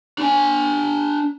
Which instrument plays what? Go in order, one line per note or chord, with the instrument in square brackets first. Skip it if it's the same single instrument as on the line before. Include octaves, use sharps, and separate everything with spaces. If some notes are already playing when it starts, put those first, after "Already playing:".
[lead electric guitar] D4 G#5